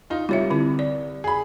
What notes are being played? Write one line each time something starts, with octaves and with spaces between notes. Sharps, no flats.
D#4 F4
C2 F4 C#5 E5
D3 C4 E4
D5
G#4 B5